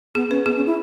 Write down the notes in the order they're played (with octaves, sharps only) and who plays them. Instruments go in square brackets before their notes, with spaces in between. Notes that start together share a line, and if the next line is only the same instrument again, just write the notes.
[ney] B3 [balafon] G#4
[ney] C#4 [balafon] B4
[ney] B3 [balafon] G#4
[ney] C#4
E4